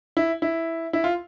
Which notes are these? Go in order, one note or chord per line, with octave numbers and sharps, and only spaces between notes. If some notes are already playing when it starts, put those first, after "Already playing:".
E4
E4
E4
F4